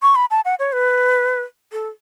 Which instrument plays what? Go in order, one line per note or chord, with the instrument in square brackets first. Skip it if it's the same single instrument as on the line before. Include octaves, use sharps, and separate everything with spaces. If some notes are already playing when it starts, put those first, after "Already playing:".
[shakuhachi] C#6
B5
A5
F#5
C#5
B4
A4